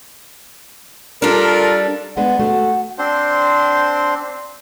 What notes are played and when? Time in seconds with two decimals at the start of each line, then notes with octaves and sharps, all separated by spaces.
1.22 G3 D4 F4 A4 A#4
2.17 G#3 B3 D4 F#5
2.39 A3 F#4
2.98 C4 D4 C5 C6